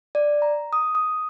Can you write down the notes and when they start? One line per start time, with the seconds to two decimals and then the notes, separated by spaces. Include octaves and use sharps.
0.15 D5
0.42 A#5
0.73 D#6
0.95 D#6